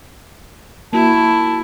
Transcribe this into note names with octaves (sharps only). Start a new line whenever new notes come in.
A#3 E4 F#4 A5